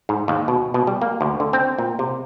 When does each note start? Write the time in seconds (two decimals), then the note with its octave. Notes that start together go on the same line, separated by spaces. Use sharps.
0.09 G#2
0.28 D#2
0.48 B2
0.74 B2
0.87 G3
1.02 A#3
1.21 D2
1.40 D3
1.53 C4
1.78 A#2
1.99 C3